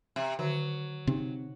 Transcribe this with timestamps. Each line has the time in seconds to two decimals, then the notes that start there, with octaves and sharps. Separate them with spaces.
0.16 C3
0.39 D3 D#3 F#3 F#4
1.07 C3 C4 D#4